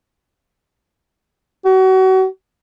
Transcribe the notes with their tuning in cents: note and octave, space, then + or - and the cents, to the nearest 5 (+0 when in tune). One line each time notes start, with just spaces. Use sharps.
F#4 +35